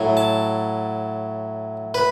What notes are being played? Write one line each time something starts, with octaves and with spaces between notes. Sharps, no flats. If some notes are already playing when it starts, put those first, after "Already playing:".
Already playing: A2 F#3
A5
B4